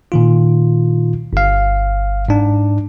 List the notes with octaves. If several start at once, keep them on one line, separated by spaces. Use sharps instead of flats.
A#2 D#3 F4
G1 F5
G#2 D4